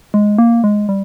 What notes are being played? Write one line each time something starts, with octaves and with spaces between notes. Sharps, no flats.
G#3
A#3
G#3
G3